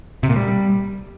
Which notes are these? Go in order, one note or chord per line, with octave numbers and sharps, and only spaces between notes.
C3
A#2
G3